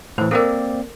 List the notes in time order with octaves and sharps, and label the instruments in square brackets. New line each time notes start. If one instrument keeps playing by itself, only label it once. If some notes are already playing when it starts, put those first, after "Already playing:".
[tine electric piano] A2 E3 [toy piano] C5
[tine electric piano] A#3 C4 D5 [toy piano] A4 A#4